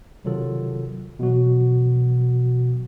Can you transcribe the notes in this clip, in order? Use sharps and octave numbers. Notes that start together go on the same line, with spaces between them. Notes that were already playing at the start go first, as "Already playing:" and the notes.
C3 D#3 F#3 F4 A4
B2 E3 F#3 F#4